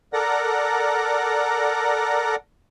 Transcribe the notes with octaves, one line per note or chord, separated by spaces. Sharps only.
A4 A#4 D5 F#5 A#5